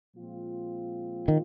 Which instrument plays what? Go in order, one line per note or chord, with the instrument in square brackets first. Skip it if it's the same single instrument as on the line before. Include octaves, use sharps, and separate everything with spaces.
[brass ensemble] A#2 F3 G#3 C4 F4
[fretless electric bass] D#3